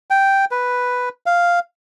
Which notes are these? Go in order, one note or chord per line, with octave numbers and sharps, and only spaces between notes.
G5
B4
F5